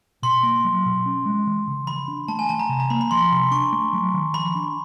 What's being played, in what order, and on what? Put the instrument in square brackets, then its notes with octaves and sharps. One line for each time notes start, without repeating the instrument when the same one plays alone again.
[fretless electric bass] B2 [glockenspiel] C6
[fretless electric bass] A#3
F#3
B2
C#4
G#3
E3
C#3
[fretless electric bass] E3 [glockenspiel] B5
[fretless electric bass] D4
[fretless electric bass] A3 [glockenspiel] A5
[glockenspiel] G#5
[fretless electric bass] E3 [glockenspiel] A5
[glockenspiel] A#5
[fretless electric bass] C3
[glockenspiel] A#5
[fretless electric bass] A#3 [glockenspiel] B5
[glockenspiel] B5
[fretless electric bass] F3 [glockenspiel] C6
[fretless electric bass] C3
[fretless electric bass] D4 [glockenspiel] C#6
[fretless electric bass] A3
F#3
D#3
[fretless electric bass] F3 [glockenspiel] B5
[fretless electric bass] D4